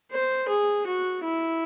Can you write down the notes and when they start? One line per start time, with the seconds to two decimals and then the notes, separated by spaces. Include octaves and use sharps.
0.12 C5
0.49 G#4
0.87 F#4
1.24 E4